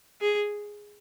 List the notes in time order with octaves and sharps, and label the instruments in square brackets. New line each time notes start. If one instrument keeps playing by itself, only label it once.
[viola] G#4